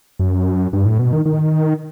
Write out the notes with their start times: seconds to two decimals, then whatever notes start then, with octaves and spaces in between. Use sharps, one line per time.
0.19 F#2
0.73 G2
0.86 A2
0.99 B2
1.12 D#3
1.26 D#3